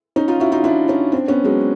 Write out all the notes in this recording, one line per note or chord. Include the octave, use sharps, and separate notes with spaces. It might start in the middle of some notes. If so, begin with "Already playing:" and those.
C#4 D#4
D#4 F4
E4 F#4
D#4 F4
D4 E4
C#4 D#4
C4 D4
B3 C#4
F#3 G#3